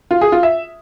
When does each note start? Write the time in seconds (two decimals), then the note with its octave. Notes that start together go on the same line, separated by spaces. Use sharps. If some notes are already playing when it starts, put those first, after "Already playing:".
0.11 F4
0.21 G#4
0.32 F4
0.43 E5